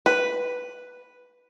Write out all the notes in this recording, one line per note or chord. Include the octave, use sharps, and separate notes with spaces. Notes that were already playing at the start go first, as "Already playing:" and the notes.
B4